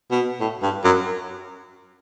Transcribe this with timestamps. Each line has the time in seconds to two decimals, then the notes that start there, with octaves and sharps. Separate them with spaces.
0.12 B2
0.40 A2
0.63 G2
0.84 F#2